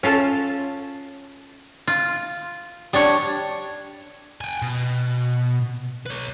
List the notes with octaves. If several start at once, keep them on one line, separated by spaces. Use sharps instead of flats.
C#4 F4 A4
F4
G3 D4 C#5
G5 G#5
B2
B4 C#5